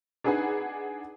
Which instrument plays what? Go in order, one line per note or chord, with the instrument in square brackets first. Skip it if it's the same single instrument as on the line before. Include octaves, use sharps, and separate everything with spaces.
[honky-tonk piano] D4 D#4 G#4 B4 F#5 G#5